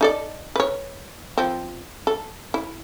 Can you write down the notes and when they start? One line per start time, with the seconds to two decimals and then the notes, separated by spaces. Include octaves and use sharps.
0.01 D#4 A4 D5
0.56 B4 C#5
1.38 F3 C4
2.07 A4
2.54 E4